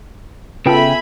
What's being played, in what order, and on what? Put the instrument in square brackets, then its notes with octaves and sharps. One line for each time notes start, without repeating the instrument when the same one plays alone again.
[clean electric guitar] C#3 G5 [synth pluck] B3 F4 A4 [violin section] E5 G#5 B5